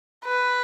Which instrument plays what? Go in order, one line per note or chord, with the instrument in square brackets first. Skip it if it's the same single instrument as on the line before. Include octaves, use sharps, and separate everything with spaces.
[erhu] B4